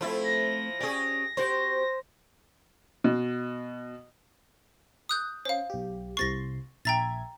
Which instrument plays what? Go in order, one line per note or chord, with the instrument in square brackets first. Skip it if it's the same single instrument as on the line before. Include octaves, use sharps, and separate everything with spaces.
[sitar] F3 E4 [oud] A3 C4
[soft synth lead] A#6
[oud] C#4 D5 [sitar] G4 G#4
[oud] C4 F#4 G4 [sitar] C5
[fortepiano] B2
[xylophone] D#6 F#6 G6
[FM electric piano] C#4 [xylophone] C5 F5
[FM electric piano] B1 G4
[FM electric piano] C2 C3 C6 [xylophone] C#6 A6 A#6
[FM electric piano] A#1 E5 G#6 [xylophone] G5 A#5 A6